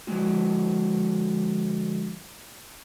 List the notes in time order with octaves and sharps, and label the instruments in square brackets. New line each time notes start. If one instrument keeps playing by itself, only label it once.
[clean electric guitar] D3 F3 G#3 A#3 F#4